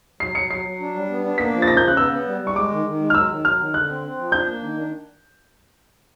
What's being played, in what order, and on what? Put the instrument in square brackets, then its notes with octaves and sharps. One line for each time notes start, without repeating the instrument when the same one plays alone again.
[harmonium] F#3 [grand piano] C7
[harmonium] F#3 [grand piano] C#7
[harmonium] F#3 [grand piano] C7
[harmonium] F#3
D4
G3
B3
D4
[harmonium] A#3 [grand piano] B6
[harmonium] F3
[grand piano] A6
[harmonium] C#3 [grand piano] A#6
[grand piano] G6
[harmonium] C#3
[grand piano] F#6
[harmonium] B3 [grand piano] E6
[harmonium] B3
G3
G3
[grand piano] C#6
[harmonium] G#3 [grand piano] D6
[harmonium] D#3
D#3
G#3
[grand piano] F6
[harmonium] F#3 [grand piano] E6
[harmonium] D#3
[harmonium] F#3 [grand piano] F6
[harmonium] D#3
[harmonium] D3 [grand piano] F#6
[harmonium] C4
C4
F3
[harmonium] D4 [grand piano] G6
[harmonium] A#3
D#3
D4